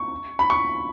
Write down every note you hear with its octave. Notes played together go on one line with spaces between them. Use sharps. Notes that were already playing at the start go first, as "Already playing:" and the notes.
Already playing: C#6
B5
C#6